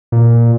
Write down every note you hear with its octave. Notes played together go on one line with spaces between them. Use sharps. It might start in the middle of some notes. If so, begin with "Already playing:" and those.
A#2